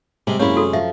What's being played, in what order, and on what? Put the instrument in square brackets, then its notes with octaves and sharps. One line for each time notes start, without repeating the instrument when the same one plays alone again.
[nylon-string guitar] C3 G#3 [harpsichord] G3 C4
[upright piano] F#2 [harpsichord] C3 G#3 C#4 [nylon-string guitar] A#3 E4 [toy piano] C#5
[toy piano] F#4 A4
[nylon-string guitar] F3 [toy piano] E5